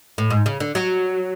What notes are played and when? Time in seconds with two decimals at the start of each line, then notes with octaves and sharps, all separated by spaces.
0.18 A2
0.30 G#2
0.46 C#3
0.60 D3
0.75 F#3